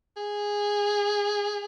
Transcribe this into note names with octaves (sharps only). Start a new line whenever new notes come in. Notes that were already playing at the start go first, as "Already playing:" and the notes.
G#4